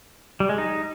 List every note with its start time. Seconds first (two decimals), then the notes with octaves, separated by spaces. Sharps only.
0.40 G3
0.49 G#3
0.58 D#4